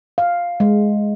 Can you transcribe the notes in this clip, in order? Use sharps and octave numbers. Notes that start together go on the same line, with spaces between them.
F5
G#3